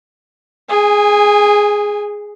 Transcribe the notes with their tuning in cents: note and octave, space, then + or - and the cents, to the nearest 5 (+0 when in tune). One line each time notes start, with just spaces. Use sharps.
G#4 +0 G#5 -25